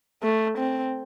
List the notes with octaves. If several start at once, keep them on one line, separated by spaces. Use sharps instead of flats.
A3
C4